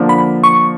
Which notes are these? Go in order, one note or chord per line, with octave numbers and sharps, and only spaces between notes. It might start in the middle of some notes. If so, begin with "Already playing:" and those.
Already playing: D3 F3 A#3 D4
B5
C#6